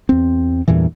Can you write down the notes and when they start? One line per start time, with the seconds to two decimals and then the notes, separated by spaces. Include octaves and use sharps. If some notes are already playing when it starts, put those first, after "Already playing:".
0.09 E2 C4
0.68 E2 G2 A#2 E3